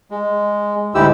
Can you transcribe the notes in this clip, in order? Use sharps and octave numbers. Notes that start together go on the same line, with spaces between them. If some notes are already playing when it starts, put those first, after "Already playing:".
G#3
D2 G#2 G#3 E4 G4 E6